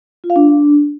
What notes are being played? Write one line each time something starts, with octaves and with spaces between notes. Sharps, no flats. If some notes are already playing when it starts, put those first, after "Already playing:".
F4
F5
D4